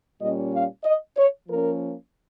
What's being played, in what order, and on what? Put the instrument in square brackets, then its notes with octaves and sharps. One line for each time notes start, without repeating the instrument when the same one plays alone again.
[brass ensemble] A#2 G3 C#4 D#5
F5
D#5
C#5
F3 A#3 C#4 A#4